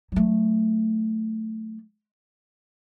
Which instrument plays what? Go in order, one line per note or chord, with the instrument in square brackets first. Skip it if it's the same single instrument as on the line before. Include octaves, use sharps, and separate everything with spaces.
[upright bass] F#3 A3